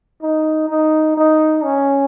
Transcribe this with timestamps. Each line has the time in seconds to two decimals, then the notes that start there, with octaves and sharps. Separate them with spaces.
0.22 D#4
0.69 D#4
1.17 D#4
1.64 C#4